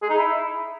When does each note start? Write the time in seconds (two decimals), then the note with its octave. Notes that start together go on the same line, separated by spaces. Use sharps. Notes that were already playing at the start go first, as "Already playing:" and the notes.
0.02 G#4
0.10 D#4
0.18 E4